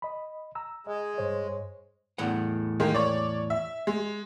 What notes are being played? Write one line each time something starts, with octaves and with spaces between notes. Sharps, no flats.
D#5 B5
A#5 E6
G#3 D#5
G2 C5 C#5
E2 A2 F#5
D#3 G#3 A#3
C#5 D5
E5
G#3